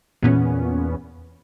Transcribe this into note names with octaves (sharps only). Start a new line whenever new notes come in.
E2 A#2 B3 C#4